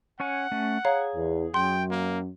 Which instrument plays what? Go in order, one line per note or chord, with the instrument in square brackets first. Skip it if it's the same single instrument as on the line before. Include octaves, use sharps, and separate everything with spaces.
[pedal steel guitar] C#4 C#5 G#5 [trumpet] F#5
[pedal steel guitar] A3 C#4
[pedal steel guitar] G#4 [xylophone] C#5 F5 A#5
[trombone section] E2
[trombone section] F#2 F#3 [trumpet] G5 [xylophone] C6
[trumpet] A#3